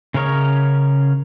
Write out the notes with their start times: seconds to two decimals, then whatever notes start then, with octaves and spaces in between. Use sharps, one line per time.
0.14 C#3 C#4 A#4 C#5 D#5